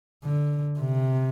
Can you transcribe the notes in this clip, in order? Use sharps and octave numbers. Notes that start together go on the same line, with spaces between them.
D3
C3